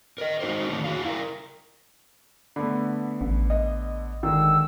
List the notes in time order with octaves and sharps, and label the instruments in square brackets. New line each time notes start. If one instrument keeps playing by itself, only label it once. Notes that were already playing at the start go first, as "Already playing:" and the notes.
[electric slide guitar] A#4 D#5
G#3 D#4 F#4 C5
D3 D#3 F3 A3 C#5
F#4 G#4 F5
E4 A#4
[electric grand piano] D3 A3 B3 [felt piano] B5
[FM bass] A1
[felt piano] D#5
[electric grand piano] D3 G#3 [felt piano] D#3 [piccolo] E6